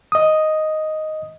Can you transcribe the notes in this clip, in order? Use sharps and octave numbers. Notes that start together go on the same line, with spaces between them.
D#5 D#6